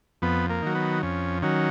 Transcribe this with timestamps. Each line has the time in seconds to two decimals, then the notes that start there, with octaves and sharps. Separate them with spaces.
0.22 F2 B3
0.50 A#3
0.62 D#3 F#3
0.75 B3
1.03 F2 C#4
1.42 D#3 F#3 C#4